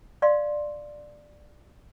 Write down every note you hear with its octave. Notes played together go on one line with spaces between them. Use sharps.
D5 F5 C6